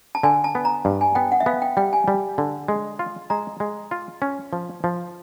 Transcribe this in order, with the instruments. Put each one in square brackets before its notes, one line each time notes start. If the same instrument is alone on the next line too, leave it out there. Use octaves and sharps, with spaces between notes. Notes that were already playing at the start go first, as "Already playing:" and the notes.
[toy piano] A5
[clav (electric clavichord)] D3 [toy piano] G#5
[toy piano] A5
[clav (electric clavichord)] B3
[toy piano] A#5
[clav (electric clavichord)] G2
[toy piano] G#5
[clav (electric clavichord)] B3 [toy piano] G5
[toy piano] F#5
E5
[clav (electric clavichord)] B3 [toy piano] F5
[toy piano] G5
[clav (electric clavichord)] G3 [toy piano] G5
[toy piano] G#5
[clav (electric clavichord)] G3
D3
G#3
F4
[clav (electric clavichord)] G#3 [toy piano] A#5
[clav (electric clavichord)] G#3
F4
C#4
F3
F3